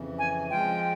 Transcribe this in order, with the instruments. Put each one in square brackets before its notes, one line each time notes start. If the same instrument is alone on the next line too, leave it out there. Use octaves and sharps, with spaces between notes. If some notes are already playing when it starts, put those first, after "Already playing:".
Already playing: [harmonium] F2 C#3 E3
[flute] G#5
[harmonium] F3 G#3 C4 F4 [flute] G5